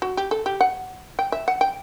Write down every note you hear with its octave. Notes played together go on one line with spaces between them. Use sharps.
F#4
G4
A4
G4
F#5
G5
E5
F#5
G5